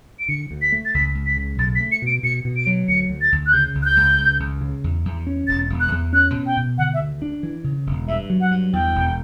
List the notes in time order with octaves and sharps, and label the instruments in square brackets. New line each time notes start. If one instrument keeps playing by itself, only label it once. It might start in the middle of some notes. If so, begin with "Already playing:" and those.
[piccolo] D7
[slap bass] D3 [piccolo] C#7
[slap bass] D2
[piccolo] B6
[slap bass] A3
[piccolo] A6
[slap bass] C#2 [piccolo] B6
[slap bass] C#2
[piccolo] B6
[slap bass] C#3
[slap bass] B1 [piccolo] A6
[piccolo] B6
[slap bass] A3
[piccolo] C#7
[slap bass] B2 [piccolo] D7
[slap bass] B2 [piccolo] C#7
[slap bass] B2
[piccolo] D7
[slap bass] F#3
[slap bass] D2 [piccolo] C#7
[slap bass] D2
[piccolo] A6
[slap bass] D2
[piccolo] F#6
[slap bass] C#3 [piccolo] G6
[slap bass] C#2
[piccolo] F#6
G6
[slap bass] C#2
C#2
C#2
C#3
E2
E2
C#4
[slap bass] E1 [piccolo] A6
[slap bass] E1
[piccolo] F#6
[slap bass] E2
[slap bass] C#4 [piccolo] F#6
[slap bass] B2
[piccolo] G5
[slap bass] B2
[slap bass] D3 [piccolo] F#5
[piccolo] E5
[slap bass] D2
D4
E3
C#3
E1
[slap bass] G2 [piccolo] E5
[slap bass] F#3
[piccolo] F#5
[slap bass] G2
[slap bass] E2 [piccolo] G5
[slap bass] E1